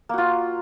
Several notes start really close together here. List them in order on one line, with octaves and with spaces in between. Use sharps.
A#3 F#4 F4